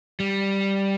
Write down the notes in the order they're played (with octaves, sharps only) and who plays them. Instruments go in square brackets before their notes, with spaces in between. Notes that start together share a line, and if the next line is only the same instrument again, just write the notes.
[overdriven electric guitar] G3